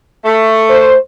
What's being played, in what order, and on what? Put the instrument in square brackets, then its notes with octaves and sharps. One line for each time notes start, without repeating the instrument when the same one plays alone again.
[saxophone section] A3
[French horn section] C5